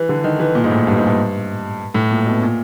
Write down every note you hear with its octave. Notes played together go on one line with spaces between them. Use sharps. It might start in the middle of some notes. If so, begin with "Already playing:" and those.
Already playing: E3
D3
D#3
E3
A#2
G#2
A2
G2
G#2
G2
A2
A#2
B2
A#2